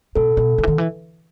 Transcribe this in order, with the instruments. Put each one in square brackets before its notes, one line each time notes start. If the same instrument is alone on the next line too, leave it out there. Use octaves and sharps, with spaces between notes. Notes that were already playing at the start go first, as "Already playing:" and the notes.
[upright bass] B2 [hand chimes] A4
[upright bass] B2
D3
E3
D#3
E3